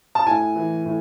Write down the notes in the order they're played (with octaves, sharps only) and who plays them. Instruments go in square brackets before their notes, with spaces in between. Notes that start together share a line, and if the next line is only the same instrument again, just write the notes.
[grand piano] A5
A2 G#5
E3
A2